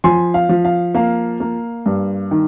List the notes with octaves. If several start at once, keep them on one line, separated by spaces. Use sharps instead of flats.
F3 G#5 C6
F5
F3
F5
A#3 F5
A#3
G2
D#3